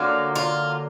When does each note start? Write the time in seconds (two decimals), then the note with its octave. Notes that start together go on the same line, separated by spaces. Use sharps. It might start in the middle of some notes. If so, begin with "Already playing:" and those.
Already playing: D3 F#3 A#3 F4
0.35 F4